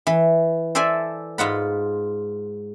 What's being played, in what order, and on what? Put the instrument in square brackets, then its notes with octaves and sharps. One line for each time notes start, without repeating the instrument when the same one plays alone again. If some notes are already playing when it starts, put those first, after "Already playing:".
[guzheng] E3
A4 C5 D5 E5 G#5
G#2 F4 F#5 B5